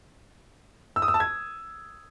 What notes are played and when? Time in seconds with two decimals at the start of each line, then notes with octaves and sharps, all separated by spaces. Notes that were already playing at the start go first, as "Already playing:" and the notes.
0.96 E6
1.02 D#6
1.08 E6
1.14 A5
1.20 G#6